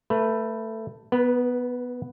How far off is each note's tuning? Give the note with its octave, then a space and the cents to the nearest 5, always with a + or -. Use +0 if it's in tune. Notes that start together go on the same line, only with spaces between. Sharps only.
A3 +15 B4 -5
B3 +0 B4 -40